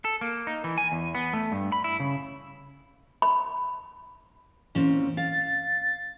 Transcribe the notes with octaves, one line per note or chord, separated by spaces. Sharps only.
A4
A#3
D#4
E3
G#5
E2
B3
A3
G2
B5
E4
C#3
B5
A#2 E3 C4 C#4
F5 A6